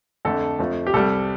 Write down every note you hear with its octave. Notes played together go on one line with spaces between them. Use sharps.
F2 D3 A3 A4
F2 F3 A3
G4
C2 C3 G3 A4